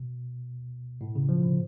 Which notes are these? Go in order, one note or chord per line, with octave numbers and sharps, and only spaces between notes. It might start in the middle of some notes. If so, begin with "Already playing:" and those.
Already playing: B2
A2
C#3
F3
D3